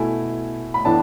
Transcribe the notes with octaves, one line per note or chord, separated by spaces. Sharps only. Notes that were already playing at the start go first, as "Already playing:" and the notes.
Already playing: B2 A3 E4 G#5
B5
A2 E3 B3 D4 A5